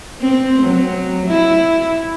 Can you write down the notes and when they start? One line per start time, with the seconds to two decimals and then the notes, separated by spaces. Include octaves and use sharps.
0.21 C4
0.62 F#3
1.26 E4